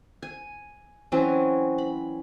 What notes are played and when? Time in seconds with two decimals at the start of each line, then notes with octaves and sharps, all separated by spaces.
0.23 G#5
1.12 E3 F#3 C4 C#4
1.78 B5